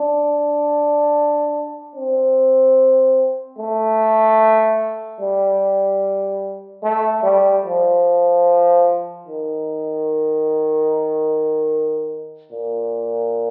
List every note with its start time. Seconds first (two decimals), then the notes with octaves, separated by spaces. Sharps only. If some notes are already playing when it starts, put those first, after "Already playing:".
Already playing: D4
1.95 C4
3.58 A3
5.20 G3
6.83 A3
7.23 G3
7.65 F3
9.27 D#3
12.51 A#2